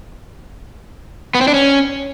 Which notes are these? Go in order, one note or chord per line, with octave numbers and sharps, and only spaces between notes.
B3
C4
D4
C#4